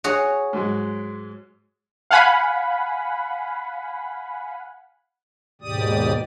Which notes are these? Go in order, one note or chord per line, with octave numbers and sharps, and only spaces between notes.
F#4 G#4 C#5
G#2 F#3 G#3
F5 F#5 G#5 B5
D#2 G#2 B2 G4 D5 D#6